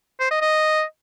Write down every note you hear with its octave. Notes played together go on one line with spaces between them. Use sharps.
C5
D#5
D#5